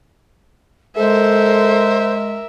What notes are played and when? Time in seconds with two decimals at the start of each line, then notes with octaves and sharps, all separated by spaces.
0.97 G#3 A4 A#4 C5 E5